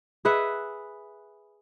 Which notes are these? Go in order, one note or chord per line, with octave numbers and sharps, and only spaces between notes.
G#4 B4 E5 F#5